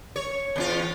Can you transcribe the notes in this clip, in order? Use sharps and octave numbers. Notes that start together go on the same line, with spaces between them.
C#5
E2 D4 F4